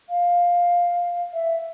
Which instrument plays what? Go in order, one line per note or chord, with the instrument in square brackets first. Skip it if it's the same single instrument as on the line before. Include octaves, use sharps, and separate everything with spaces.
[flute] F5
E5